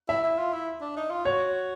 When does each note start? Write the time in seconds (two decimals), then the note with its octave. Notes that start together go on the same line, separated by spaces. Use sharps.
0.09 E4 E5
0.24 E4
0.38 F4
0.53 E4
0.81 D4
0.97 D#4
1.11 F4
1.25 F#4 C#5